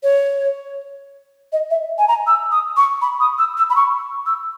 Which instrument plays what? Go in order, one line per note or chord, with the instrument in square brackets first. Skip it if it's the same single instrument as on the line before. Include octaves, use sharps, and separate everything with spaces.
[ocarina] C#5
D#5
E5
G#5
A#5
E6
D#6
C#6
B5
D#6
E6
E6
B5
C#6
E6